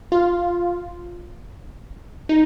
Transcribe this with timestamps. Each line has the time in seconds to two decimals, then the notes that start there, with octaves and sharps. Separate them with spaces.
0.12 F4
2.29 D#4